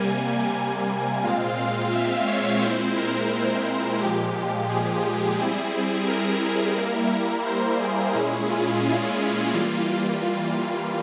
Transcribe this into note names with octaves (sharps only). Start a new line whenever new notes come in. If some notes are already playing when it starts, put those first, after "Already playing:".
Already playing: C3 G3 A#3 G#5
A#2 G#3 C4 F4 F5
F5
E5
C#5
A#2 G#3 C4 E4 C5
A#4
A#2 F3 G#3 G4
G#4
G3 C4 E4 G#4
A#4
G3 A#3 E4
C5
G#4
A#2 G#3 C#4 E4 G#4
F4
F4
E3 G3 A#3 F4
F4